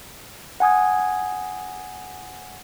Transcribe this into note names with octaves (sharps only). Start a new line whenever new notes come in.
F#5 G#5 D#6 G#6